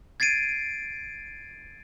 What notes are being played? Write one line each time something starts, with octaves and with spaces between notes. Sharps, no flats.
G#6 A6 C7 D7 D#7